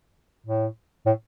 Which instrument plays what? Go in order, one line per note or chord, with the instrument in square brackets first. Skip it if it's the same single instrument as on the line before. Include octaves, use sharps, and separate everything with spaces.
[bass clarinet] A2
A2